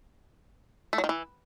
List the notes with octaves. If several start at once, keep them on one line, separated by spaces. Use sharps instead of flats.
A3
F#3
D#3
E3